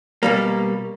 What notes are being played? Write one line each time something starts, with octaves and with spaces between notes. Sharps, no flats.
B2 G3 A#3